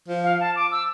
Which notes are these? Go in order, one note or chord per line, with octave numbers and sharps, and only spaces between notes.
F3
F5
A5
D6
E6